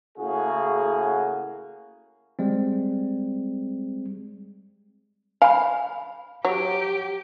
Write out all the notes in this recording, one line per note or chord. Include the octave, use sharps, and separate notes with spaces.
A2 C#3 A#3 F#4 G#4
G3 G#3 C4
F5 G#5 B5
F#3 G4